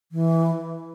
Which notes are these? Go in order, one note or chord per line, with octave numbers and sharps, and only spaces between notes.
E3